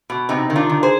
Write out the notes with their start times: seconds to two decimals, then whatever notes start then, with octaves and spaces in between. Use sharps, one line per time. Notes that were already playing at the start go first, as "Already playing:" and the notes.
0.10 B2
0.29 C3 C4 D#4
0.50 D#3
0.56 D4 F4
0.70 D#3
0.83 G#4 C5